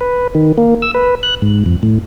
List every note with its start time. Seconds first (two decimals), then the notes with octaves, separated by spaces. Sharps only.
0.01 B4
0.35 D#3
0.58 A#3
0.82 E6
0.94 B4
1.23 F#6
1.42 G#2
1.66 F2
1.83 A2